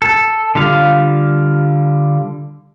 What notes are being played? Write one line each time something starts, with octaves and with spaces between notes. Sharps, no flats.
A4
D3 G3 F4 F5